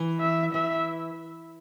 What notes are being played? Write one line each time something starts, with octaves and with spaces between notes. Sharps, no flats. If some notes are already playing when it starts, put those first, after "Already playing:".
Already playing: E3
E5
E3 E5